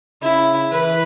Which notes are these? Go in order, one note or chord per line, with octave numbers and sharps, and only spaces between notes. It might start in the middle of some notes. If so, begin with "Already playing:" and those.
C#3 E4
E3 B4